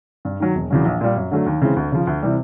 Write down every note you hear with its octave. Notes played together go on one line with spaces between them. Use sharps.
G2
D#3 F#3
E1
E2 C#3 F#3
A#1
A#2 G3
F#2
D3 F#3 A3
D#2
C#3 E3 G#3 C4
D2
C#3 F3
D2
C3 E3 G3